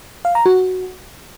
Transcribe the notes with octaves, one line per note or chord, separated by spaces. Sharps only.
F5
A#5
F#4